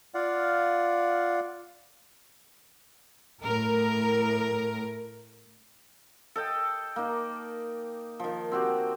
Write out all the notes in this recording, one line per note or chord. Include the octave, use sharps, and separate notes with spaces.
F4 D5 F5 F#5
A2 A#4
A4 D#5 G5
A#3 D#4
D#3 F3
C4 F#4 G4